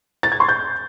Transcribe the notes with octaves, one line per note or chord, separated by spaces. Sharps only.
A6
G#6
C6
G6